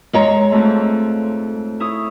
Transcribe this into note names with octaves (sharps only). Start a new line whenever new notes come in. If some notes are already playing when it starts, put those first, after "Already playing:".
G#3 C#5 A#5
F2 G#2 A3
E4 C#5 D#6